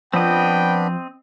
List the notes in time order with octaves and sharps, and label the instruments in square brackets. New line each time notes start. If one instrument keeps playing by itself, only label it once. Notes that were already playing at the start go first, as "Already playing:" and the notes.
[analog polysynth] F3 [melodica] B3 D4 B5 [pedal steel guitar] C4 D#5 [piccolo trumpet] G5